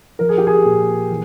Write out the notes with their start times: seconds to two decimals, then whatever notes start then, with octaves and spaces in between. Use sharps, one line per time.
0.19 F3 A#4
0.29 G#4
0.38 G4
0.47 G#4
0.65 A#2
1.10 E3